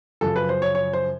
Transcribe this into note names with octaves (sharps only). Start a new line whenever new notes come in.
F#2 C#3 F3 A4
B4
C5
C#5
C#5
C5